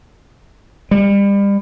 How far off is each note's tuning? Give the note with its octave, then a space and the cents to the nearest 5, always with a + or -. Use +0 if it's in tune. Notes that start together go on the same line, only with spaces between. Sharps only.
G3 +35